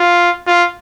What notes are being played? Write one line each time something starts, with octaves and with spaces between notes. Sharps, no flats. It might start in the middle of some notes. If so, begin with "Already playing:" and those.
Already playing: F4
F4